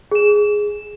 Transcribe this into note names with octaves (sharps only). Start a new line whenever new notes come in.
G#4 E7